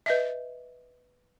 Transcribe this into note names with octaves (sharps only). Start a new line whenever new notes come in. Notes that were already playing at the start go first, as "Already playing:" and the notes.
B4 D#5 E5